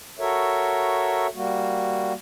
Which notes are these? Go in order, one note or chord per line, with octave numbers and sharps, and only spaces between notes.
F#4 A4 A#4 C#5 E5
G3 A#3 F#4